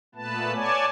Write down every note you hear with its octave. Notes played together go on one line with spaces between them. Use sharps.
A#2 A3 B3 B4 A5
C#5 D5 G#5 A5